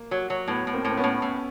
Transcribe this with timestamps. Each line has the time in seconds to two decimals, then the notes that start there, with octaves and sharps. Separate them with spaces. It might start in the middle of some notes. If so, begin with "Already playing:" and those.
Already playing: A#3
0.11 F#3
0.30 F#3
0.48 A2 B3
0.67 A2
0.73 A#3 C4
0.85 A2 C4
0.97 B3 C#4
1.04 A2
1.22 A2